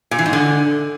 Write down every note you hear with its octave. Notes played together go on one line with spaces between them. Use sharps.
A#2
E3
G#2
D3